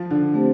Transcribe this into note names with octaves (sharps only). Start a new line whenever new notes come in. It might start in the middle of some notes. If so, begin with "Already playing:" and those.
Already playing: F3
D3
A3 C4 G4 C5